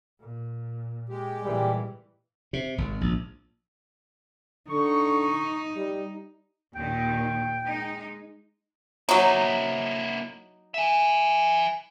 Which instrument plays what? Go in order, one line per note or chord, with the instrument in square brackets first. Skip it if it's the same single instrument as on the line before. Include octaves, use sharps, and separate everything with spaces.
[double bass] A#2
[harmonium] G#3 G4
[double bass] A#2 E3 [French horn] G3
[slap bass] C3
G#1
A#1
[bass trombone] D3 [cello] D#4 [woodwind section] C#6
[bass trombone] G3
[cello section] D#2 A#2 D#3 [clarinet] G5
[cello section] G#3 D#4
[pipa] F#3 D#4 [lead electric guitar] A#3 E4
[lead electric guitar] E5 G#5